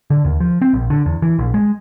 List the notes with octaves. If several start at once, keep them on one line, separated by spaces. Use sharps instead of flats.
D3
D#2
F3
C4
A#1
D3
E2
E3
A#1
G#3